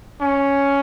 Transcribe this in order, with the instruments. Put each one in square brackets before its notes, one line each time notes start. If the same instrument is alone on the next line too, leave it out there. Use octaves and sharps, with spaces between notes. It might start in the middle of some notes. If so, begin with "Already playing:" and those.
[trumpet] C#4